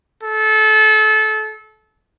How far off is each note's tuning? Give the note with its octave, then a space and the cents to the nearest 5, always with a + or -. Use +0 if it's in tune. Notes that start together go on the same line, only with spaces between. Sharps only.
A4 -25